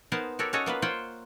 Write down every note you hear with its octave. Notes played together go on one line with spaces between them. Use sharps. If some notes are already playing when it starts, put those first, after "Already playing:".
B3 D#4 A#4 C5 G#5 A5
F#4 G4 A4 A#4 C#5
C#4 F#4 A4 C#5 D#5
A#3 B3 F4 B4
F4 C5 C#5 F#5 G5